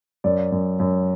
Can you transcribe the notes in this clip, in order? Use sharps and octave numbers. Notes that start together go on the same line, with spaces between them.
F#2 D5
F#2
F#2